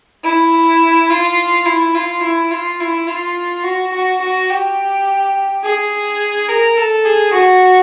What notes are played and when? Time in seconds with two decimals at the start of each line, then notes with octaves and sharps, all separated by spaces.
0.24 E4
1.10 F4
1.66 E4
1.94 F4
2.23 E4
2.51 F4
2.80 E4
3.07 F4
3.64 F#4
3.93 F#4
4.21 F#4
4.50 G4
5.64 G#4
6.49 A#4
6.77 A4
7.05 G#4
7.33 F#4